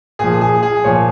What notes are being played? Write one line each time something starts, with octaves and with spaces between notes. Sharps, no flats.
A#2 F3 G#4
G#4
G#4
A#2 F3 C#5